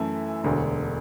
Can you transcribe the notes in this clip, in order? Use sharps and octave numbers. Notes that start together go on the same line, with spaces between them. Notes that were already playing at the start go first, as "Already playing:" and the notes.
Already playing: F#2 E3 A3 E4
E1 D2 D3